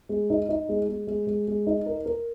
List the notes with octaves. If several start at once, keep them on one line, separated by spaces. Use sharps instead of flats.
G#3
D#4
D#4
G#3
G#3
G#3
G#3
G#3
D#4
A#4
A#4